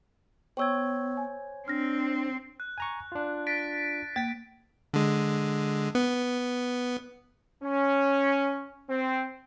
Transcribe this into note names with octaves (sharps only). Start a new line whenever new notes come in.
B3 C5 C#5 G5 C#6 E6 G#6
G#5
C4 D4 F6 A#6
F#6
G#5 A#5 C#6
D4 F4
A6 B6 D7
A#3 A6 B6
D3 G#3
B3
C#4
C4